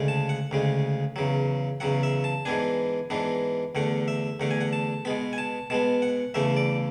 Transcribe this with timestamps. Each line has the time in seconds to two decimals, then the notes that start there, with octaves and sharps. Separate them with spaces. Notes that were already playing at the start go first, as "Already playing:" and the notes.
Already playing: D2 C#3 G#3
0.08 A5
0.29 F#5
0.51 D2 C#3 G#3
1.16 E2 C#3 F#3
1.80 E2 C#3 F#3 F#5
2.03 E5
2.24 A5
2.45 G#2 E3 B3 D4 G#5
3.10 G#2 E3 B3 D4
3.75 E2 D3 A3 F#5
4.08 E5
4.40 E2 D3 A3 F#5
4.51 G#5
4.61 F#5
4.73 A5
5.05 B2 G#3 B3 B5
5.33 G#5
5.38 A5
5.70 B2 G#3 B3 A5
6.02 F#5
6.34 E2 C#3 E3 A3 E5
6.57 D5